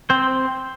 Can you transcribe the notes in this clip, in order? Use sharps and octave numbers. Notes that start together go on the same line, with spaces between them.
C4 C5